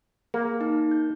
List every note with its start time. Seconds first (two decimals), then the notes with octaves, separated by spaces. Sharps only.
0.34 A#3 G#4
0.61 D#4
0.91 G6